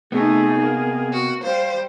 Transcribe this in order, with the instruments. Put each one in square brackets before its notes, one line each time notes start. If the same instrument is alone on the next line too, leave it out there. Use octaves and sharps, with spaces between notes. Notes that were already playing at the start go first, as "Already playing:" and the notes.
[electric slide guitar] C3 B3 [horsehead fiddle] A3 D#4 [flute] G#4
[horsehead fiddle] A#3
[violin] F#4
[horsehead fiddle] G3 [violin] C5 [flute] F5